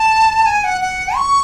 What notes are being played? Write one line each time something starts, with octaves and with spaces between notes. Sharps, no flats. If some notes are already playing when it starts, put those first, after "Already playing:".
Already playing: A5
G#5
F#5
F#5
C#6